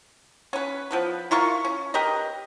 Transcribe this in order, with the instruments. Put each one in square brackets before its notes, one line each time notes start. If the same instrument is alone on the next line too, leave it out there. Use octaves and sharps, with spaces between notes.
[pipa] C#4 B4
F3 B3 B4
E4 F4 A#4 C#6
C#4
G4 A#4 B4 D#5